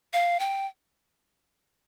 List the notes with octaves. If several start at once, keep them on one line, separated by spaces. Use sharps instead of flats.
F5
G5